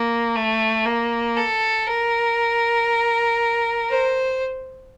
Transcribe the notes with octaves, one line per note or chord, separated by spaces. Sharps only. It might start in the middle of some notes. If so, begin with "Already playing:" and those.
Already playing: A#3
A3
A#3
A4
A#4
C5